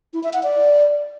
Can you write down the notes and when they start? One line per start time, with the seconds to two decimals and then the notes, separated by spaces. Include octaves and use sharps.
0.14 E4
0.23 E5
0.33 F#5
0.43 D5